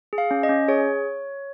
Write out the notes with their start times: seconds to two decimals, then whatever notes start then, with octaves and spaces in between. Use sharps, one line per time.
0.13 G#4
0.18 F5
0.31 C#4
0.43 D#5
0.49 C#4
0.68 G#4 C#5